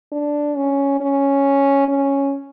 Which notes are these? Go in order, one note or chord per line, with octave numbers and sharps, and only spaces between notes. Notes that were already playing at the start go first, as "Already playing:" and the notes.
D4
C#4
C#4
C#4